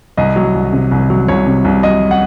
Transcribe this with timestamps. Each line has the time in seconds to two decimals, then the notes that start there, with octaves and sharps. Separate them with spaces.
0.17 C2 D#5
0.36 F#3
0.55 C2
0.73 C3
0.91 C2
1.10 F#3
1.28 C2 C#5
1.47 C3
1.65 C2
1.83 F#3 D#5
2.11 F#5